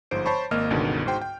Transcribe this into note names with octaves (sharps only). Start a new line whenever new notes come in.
G1 G#2 F3 C5 D7
C5 C#5 A5 B5 C#6
G#1 A#3 D#5 F6
G1 C#2 B2 D3 D#3
G#2 F#4 C5 G5 C6
G5